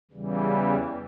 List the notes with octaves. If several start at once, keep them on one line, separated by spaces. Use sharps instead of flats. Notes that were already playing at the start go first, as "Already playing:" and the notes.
E2 C#3 E3 G3